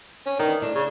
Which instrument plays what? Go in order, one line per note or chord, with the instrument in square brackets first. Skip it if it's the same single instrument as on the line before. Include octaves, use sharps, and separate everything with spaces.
[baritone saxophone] C#4
[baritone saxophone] D#3 [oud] E3 D4
[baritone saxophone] A2 [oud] D4
[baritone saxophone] C#3